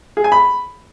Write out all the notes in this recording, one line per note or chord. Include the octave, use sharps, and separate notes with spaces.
G#4
G#5
B5